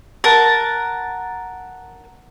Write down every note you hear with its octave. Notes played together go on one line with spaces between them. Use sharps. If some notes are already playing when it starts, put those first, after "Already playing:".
A#4 F#5 A5